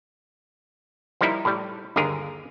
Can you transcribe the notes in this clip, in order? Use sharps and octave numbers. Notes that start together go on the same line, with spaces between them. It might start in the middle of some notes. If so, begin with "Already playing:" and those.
F3 G3 A#3 D#4 E4
A2 G3
G1 D#2 D3 G#4 A#4